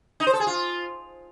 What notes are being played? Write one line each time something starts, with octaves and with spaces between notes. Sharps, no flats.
D#4
C5
A4
G#4
F4